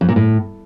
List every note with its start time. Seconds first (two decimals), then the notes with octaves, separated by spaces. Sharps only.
0.01 F2
0.09 A#2
0.16 A2